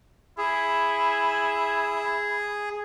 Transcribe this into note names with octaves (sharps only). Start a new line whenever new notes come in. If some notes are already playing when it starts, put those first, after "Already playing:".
E4 G#4